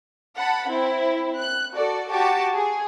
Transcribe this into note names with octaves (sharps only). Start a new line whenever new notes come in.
F#5 A5 B5
C4 E4
F#6
F#4 A4 D5
F#4 G4 A5 D6
G#4